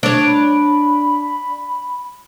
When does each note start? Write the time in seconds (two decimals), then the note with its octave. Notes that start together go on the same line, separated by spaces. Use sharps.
0.03 D4 C#5
0.26 B5